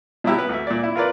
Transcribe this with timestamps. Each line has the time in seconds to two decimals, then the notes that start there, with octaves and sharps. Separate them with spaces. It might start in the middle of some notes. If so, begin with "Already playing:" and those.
0.24 B2 F#3 E4 G4
0.37 B3 B4
0.49 D2 E5
0.67 A#2 D5
0.83 E4
0.95 F4 A#4 B4 D5